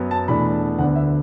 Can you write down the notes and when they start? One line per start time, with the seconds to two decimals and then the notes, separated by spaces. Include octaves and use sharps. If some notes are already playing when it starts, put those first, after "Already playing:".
Already playing: F#2 F#3 B3
0.11 A5
0.28 E2 B2 A3 D4 B5
0.79 D2 D3 B3 D4 F#5
0.96 E5